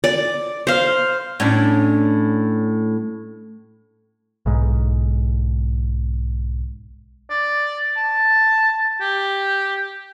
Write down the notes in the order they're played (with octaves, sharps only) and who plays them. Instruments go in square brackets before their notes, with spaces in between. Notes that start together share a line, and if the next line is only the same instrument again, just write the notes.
[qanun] D5
C5 F5
[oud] A2 C#4 D4
[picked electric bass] B1 G#2
[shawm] D5
A5
G4